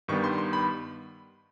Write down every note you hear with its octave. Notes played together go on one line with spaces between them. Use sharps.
G2 D#3 G3 B3 C#6
C6
C6
B5